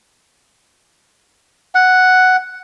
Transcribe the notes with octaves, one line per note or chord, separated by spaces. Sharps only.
F#5